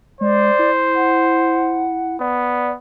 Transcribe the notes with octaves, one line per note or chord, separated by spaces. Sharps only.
G#3 C5 D5
E4
F#5
B3 D5